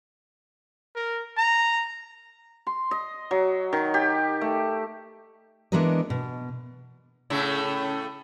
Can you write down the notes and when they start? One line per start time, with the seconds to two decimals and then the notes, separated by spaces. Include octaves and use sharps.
0.95 A#4
1.38 A#5
2.67 C6
2.91 D#5
3.31 F#3
3.73 D#3
3.94 G4
4.41 A3
5.72 E3 G#3 B3 D4 A#4 D#5
6.10 B2
7.30 A2 C#3 A3